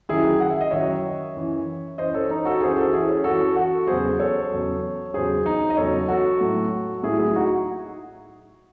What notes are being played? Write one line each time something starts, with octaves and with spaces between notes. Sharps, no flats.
F#2 D#3 F#3 E4 G#4
F#5
E5
D#5
F#2 D#3 F#3 C#5 E5
F#2 E3
F#2 E3 C5 D#5
A4 C#5
D#4
F#4 A4
F#2 E3 G#4 C5
F#4 A4
E4 G#4
C#4
F#2 E3 F#4 A4
F#4 A4
E2 C#3 F#3 G#4 C5
A4 C#5
E2 C#3 F#3
E2 C#3 F#3 G#4 C5
D#4
D#5
E2 C#3 F#3 A4 C#5
F#4 A4
A2 F#3
A2 F#3 E4 G#4
E4 G#4
D#4 F#4